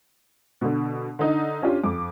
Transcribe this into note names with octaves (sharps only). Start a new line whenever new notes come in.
B2 D3
D3 D#4
C#4 D4 F4 G4
F2 D6